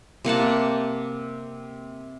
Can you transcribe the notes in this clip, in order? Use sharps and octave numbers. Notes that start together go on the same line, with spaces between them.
C3 A#3 F#5 A5